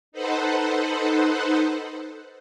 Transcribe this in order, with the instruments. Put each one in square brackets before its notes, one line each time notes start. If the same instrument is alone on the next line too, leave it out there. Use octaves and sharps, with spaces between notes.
[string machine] D#4 A4 B4 C5 F#5